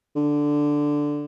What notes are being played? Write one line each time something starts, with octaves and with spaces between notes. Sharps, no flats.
D3